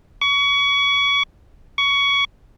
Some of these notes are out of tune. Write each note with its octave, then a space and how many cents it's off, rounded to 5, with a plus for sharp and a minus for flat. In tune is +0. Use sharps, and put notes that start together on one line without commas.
C#6 +30
C#6 +20